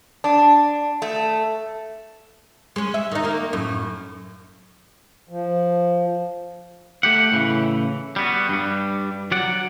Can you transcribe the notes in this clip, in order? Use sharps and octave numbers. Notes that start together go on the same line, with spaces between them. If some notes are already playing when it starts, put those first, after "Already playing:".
D4
A3
G#3 C#4
E5
D#3 D#4
D#3 A#3
F#2 A2
F3
A3 G4 F#5
A2 C#3 E3
G3 B3 F#4
G2 G3
F#3 D5 F#5